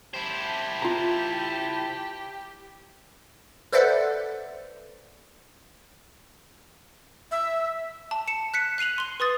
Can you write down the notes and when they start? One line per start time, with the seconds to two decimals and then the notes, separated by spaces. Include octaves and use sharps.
0.14 E4 G4 C5 A5
0.82 F4 A#5
3.72 A4 B4 C5 D5 E5 F#5
7.31 E5
8.11 A5
8.28 C#7 E7
8.54 F#6 B6 C#7
8.78 F#6 C7 D#7 F7 F#7
8.98 C6 G7
9.20 B4 C6 D#6 A6